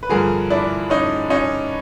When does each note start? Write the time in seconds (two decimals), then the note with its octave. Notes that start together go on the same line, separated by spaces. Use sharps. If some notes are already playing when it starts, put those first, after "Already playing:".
0.03 B4
0.09 G2 D3 F3 G#4 A#4
0.50 D4 E4
0.90 C#4 D#4
1.30 C#4 D#4